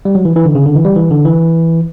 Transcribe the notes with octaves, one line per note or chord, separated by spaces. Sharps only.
G3
F#3
E3
E3
D3
C#3
D3
E3
G3
E3
D3
E3